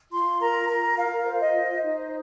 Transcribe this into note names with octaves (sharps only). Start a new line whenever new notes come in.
F4 C6
A#4 A#5
A#4 A#5
F4 F5
C5
D#5
C5
D#4